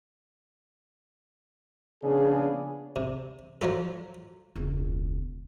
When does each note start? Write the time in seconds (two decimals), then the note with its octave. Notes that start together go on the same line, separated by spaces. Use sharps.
2.04 A#1 C#3 B3 D4 G#4
2.96 C3
3.61 F3 F#3 F4 A4
4.55 E1 C#2